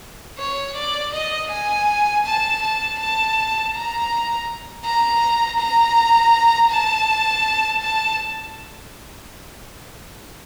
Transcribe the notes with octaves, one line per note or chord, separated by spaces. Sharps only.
C#5
D5
D#5
G#5
A5
A5
A5
A#5
A#5
A#5
A5
A5